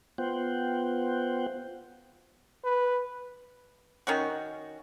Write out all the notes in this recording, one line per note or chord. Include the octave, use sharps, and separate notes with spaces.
B3 F4 C5 F#5 G5
B4
D#3 C#4 F#4